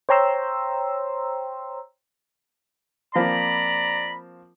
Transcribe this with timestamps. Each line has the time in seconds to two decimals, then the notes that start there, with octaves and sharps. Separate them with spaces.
0.09 C5 C#5 G5 A#5 C6 E6
3.16 F3 A#3 C4 D5 A#5 B5